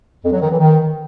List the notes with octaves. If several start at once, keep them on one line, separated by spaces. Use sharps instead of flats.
F2
F#3
D#3
E3
D#3